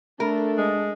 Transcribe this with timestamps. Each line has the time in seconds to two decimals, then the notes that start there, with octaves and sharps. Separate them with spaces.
0.20 A3 D4 A4 A#4
0.58 G#3